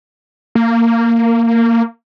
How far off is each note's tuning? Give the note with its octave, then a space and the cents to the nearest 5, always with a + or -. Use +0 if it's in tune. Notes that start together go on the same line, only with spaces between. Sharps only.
A#3 -15